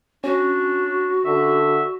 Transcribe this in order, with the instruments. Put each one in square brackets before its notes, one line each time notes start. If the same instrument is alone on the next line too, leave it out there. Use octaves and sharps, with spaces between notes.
[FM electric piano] C#4 [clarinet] D4 [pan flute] F#4
[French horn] D3 [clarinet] E5